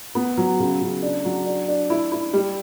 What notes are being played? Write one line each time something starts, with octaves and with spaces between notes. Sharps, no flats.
B3
F#3
C#3
C#3
D4
F#3
D4
D4
E4
E4
G3